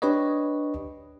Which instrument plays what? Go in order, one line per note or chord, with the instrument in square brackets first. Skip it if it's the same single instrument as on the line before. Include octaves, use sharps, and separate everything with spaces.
[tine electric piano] D4 G4 B4 C#5 D#5